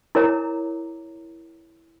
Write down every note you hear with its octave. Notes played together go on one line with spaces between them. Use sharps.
E4 A#4 C#5 A#5